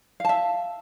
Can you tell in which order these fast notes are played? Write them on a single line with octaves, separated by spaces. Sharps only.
F5 A5 E5